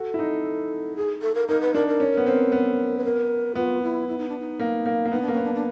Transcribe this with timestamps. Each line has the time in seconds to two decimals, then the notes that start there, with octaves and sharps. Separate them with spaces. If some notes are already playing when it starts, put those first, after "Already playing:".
Already playing: F#4 A4
0.14 E4
0.19 D#4
0.96 G#4
1.22 A4
1.35 A#4
1.48 D#4 A#4
1.61 B4
1.74 D4 A#4
1.88 A#4
2.00 C#4
2.17 B3
2.26 C4
2.52 B3
2.98 B4
3.04 A#4
3.55 B3 F4
3.82 E4
4.08 E4
4.18 D#4
4.29 D4
4.39 D#4
4.60 A#3
4.86 A#3
5.05 A#3
5.12 B3 D#4
5.22 D4
5.28 A#3
5.33 B3 C#4
5.44 D4
5.54 D4